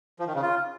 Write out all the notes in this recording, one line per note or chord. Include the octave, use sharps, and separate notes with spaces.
F3
D#3
C#3
F4